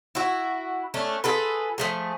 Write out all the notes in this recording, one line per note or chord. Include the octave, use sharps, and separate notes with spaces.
E4 F#4
A3 C#4 D4
F4 G#4 A4 B4
F3 A3 G#4